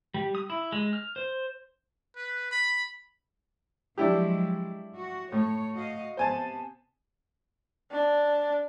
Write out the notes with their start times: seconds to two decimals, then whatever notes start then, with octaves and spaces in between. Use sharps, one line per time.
0.14 G3
0.35 D#6
0.50 E4
0.72 G#3
0.93 F6
1.16 C5
2.16 B4
2.51 B5
3.98 F3 F#3 G#3 D4 E4 G4
4.95 F#4
5.32 A2 C#5
5.73 F#4 D#5 F5
6.17 C3 B3 C5 G#5 A5
7.92 D4